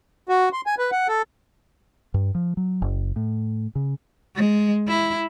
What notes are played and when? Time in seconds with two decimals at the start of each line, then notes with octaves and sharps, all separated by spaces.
0.29 F#4
0.53 C6
0.67 G#5
0.78 B4
0.92 F#5
1.08 A4
2.14 G2
2.35 F3
2.57 F#3
2.82 F#1
3.16 A2
3.75 C#3
4.36 G#3
4.88 E4